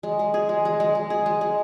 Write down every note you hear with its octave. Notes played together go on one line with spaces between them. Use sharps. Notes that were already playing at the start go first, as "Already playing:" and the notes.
G#3
G#3
G#4
G#3
G#3
G#3
G#3
G#4
G#3
G#3